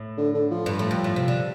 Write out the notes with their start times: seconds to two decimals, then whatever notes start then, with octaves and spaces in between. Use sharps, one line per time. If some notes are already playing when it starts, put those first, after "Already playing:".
Already playing: A2
0.17 D3
0.34 D3
0.51 F3
0.66 G2
0.79 A2
0.91 G2
1.04 A2
1.16 C3
1.28 D3